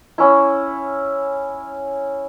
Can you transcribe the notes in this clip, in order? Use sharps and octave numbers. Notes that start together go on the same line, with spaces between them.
C#4 E4